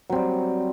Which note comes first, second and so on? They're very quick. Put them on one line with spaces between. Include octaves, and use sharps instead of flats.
F#3 C4 G3